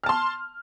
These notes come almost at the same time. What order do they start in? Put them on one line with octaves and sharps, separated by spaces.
F6 A5 C6